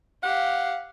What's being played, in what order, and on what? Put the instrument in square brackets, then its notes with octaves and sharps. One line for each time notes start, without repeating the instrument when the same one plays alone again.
[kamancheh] G4 F5 [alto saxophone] F#5